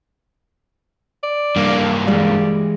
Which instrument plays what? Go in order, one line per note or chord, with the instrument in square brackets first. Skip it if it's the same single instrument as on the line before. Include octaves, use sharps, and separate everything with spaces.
[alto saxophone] D5
[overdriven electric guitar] G2 A#3
[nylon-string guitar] E3 G#3 D5 [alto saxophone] G3